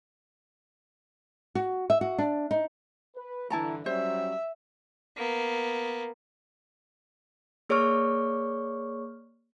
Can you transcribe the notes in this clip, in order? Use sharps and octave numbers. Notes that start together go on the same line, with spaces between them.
F#4
E5
F#4
D4
D#4
B4
G2 D3 E3 E4 A5 A#5
F#3 G3 C#4 C5 E5
A#3 B3
A#3 G#4 C#5 D5 C#6 F6